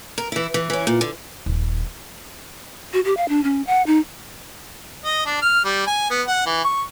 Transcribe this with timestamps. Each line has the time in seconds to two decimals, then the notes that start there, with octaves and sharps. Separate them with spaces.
0.18 A#4
0.32 E3 E4
0.54 E3
0.70 E3 C#4
0.87 A#2
1.01 D3
1.46 D#1
2.93 F#4
3.05 G4
3.17 F5
3.29 D4
3.44 C#4
3.67 F#5
3.87 D#4
5.04 D#5
5.26 D4
5.42 F6
5.65 G3
5.87 G#5
6.10 B3
6.27 F#5
6.46 E3
6.64 C#6